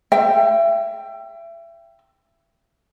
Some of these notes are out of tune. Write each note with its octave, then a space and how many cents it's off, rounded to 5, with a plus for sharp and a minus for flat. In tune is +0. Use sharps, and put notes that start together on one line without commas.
E5 +30 G5 +0